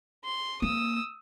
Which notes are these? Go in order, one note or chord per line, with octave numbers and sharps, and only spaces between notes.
C6
A#3 D#6 E6